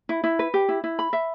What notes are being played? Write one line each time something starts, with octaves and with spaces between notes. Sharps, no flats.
E4
E4
B4
G4
E4
E4
B5
E5